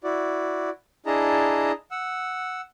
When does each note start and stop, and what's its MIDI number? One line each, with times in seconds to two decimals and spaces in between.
0.04 0.70 64
0.04 0.70 66
0.04 0.70 74
1.06 1.72 62
1.06 1.72 64
1.06 1.72 68
1.06 1.72 75
1.06 1.72 81
1.06 1.72 82
1.91 2.61 78
1.91 2.61 88